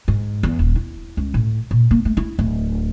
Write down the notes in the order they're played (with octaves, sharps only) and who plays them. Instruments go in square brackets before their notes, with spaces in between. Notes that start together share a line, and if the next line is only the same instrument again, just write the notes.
[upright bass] G#2
E2
D#1
E4
C#2
A2
A#2
A#3
A3
E4
D1